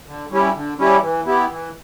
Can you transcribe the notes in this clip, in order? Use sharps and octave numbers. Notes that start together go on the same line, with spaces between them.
D3
G3 C#4 E4 G4
D3
G3 C#4 E4 G4
E3
B3 E4 G4
E3